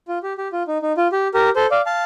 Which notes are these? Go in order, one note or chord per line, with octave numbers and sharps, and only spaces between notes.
F4
G4
G4
F4
D#4
D#4
F4
G4
G4 A#4
A4 C5
D5 F5
F5 A5